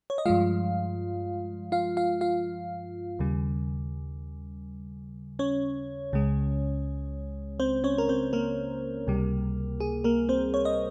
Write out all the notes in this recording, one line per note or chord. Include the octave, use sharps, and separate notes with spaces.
C#5
D#5
G2 F3 G#3 F4 F5
F4 F5
F4 F5
F4 F5
D#2 C#3 G3
C#4 C#5
C#2 C#3 G#3
C4 C5
C#4 C#5
A#4
C4 C5
A#3 A#4
C#2 C3 G3
G#4
A#3 A#4
C4 C5
C#5
D#5